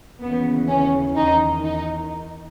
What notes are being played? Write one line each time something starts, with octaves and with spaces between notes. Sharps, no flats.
D#2 C#3 E3 B3
C#4
E2 D#3 D#4
D#4